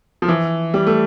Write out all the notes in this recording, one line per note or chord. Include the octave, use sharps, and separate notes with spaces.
F3
E3
G3
A3